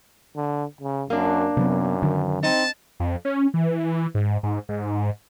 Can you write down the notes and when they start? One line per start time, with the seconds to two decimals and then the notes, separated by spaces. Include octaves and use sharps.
0.36 D3
0.81 C#3
1.10 F#2 A#3 D4
1.57 F#2 C3 F#3 B3
2.02 D3 D#3 F#3
2.43 C4 D#4 A5
3.00 F2
3.25 C#4
3.54 E3
4.15 G#2
4.43 G#2
4.69 G#2